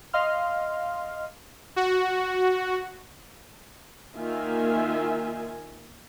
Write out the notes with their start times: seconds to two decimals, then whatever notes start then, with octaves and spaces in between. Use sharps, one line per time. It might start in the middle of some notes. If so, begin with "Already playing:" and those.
0.13 D#5 F5 C6 F6
1.76 F#4
4.17 D#3 A#3 F4 E5 G#5